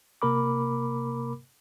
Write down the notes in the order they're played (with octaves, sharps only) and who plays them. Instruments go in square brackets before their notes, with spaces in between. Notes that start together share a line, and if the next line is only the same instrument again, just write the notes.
[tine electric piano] C3 A#3 A#4 B5 D6